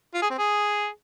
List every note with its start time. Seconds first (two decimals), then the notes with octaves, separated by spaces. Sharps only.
0.14 F4
0.22 G#4
0.30 C4
0.38 G#4